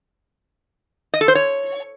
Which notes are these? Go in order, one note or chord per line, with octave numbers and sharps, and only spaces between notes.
D#5
A4
C5
C#5